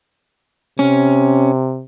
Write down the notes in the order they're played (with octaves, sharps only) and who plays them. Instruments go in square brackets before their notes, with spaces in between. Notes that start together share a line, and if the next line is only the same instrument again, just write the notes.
[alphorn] C3 [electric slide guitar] C#4